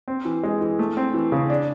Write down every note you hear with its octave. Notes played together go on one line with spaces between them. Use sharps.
C4
E3
G#3
E3
A3
C4
E3
C#3
D4